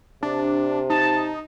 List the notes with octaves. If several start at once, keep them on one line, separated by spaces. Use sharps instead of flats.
C3 D4
D#4 A5